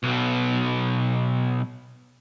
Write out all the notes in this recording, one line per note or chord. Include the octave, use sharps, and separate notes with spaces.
B1 B2